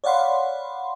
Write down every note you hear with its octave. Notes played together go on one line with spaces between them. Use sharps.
C#5 D5 F5 F#5 B5 C6